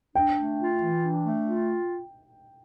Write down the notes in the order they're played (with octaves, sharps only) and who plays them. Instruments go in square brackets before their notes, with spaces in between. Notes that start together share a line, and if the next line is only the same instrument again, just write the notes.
[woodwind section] D4 [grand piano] G5
[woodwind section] A3
F4
E3
D4
A3
F4